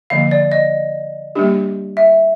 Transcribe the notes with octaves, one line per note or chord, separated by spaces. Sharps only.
D3 F3 A#3 F5
D5
D#5
G3 A#3 D4 G4
E5